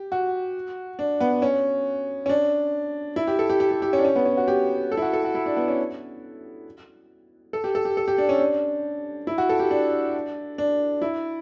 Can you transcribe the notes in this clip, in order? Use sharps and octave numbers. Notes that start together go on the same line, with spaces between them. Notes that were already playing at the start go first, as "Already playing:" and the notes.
Already playing: G4
F#4
D4
B3
C#4
C#4
D4
E4
G4
A4
G4
G4
G4
G4
C#4
D4
C#4
B3
C#4
F#4
G4
A4
E4
F#4
A4
F#4
E4
D4
B3
C#4
A4
G4
A4
G4
A4
G4
D4
C#4
D4
E4
F#4
A4
G4
D4
D4
E4